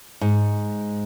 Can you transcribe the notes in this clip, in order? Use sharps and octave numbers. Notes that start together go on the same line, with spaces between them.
G#2